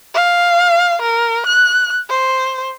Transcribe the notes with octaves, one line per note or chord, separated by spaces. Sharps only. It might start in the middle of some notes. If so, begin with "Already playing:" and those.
F5
A#4
F#6
C5